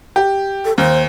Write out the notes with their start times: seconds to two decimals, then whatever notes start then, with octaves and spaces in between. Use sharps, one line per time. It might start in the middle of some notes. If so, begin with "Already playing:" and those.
0.16 G4
0.65 A4
0.78 D#2 C5